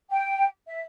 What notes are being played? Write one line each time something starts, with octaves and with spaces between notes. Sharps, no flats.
G5
E5